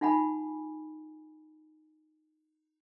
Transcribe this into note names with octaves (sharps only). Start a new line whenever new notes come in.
D#4 F4 F#5 G#5 B5